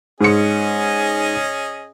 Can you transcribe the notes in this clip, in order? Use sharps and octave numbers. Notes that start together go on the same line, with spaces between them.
G#2 C#4 G#4 D#5 C#7